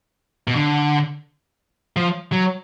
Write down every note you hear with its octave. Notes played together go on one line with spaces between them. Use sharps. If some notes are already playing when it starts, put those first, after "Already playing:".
B2
D3
F3
F#3